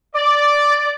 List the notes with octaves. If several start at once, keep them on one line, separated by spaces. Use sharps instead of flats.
D5